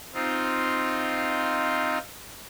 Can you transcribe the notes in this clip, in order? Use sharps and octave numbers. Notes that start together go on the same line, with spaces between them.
C4 D#4 F4